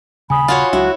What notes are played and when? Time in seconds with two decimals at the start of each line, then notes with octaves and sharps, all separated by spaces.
0.30 D#1 C#3 G#5 B5 D#6
0.48 F4 F#4 C#5
0.73 C#2 F#3 D4 E4 F#4